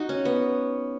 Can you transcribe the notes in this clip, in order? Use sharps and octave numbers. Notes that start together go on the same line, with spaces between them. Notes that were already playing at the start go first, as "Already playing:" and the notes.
Already playing: D#4 F#4
C#4
B3